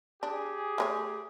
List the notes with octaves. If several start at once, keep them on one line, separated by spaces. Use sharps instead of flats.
D4 G4 G#4
A3 A#4 C#5